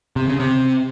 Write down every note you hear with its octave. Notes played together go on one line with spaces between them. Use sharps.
C3
C#3
C3